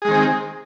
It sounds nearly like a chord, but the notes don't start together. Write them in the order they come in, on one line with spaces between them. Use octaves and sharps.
G#4 G#3 D#3 C4